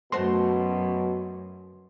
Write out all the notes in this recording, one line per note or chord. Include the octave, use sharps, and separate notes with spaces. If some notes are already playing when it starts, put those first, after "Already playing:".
F#2 B2 A3 F#4 C5 C6